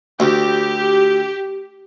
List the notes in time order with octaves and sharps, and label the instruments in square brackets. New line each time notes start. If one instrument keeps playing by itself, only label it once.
[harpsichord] D2 [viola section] G4